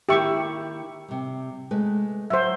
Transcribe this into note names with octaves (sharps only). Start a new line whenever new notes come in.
D#3 A#3 E4 G4 E5 C#6
C3 G3
G#3 A3 B4
F#3 C5 E5